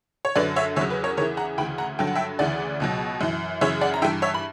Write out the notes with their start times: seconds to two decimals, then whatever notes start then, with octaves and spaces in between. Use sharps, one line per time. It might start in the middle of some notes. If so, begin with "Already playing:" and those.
0.25 C#5
0.36 F#2 D3 F#3 B4 D5
0.56 C#5 E5
0.76 E2 C#3 F#3 C#5 E5
0.90 B4
1.04 A#4 C#5
1.17 E2 C#3 E3 A#4 C#5
1.37 F#5 A#5
1.58 D2 C#3 E3 G5 B5
1.78 F#5 A#5
1.99 G2 D3 F#3 G5
2.07 F#5
2.15 E5 G5
2.39 D2 C#3 E3 D5 F#5
2.80 C#2 B2 F#3
3.21 F#2 E3
3.61 F#2 C#3 E3 C#5 E5
3.81 D5 F#5
3.94 A#5
4.02 G2 E3 E5 G5
4.22 C#5 E5
4.34 B5